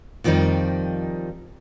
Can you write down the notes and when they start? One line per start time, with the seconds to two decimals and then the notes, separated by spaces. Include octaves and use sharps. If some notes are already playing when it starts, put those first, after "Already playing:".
0.24 F2 D#3 F3 G3 D#4